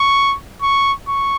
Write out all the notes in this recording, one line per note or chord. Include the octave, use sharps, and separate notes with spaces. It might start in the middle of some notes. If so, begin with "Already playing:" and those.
Already playing: C#6
C#6
C#6